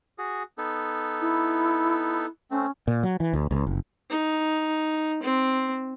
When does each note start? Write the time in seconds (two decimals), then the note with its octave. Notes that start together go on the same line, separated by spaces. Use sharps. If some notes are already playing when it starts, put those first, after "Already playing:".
0.18 F#4 G#4
0.58 B3 D#4 A4
1.21 E4
2.51 A3 C4 C#4
2.88 A#2
3.03 F#3
3.20 E3
3.34 D2
3.51 C#2
3.67 F#1
4.10 D#4
5.22 C4